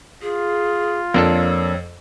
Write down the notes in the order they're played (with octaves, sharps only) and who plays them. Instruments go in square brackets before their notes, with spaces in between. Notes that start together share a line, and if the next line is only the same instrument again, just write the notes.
[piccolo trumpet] F4 [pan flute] G#4
[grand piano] F2 [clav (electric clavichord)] A#3 D4 A4 [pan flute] C#5